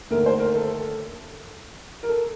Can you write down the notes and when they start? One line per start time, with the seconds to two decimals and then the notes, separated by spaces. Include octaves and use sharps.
0.10 D#2 D3 A3 A#4
0.26 C5
0.40 A#4
0.56 A4
2.03 A#4
2.09 A4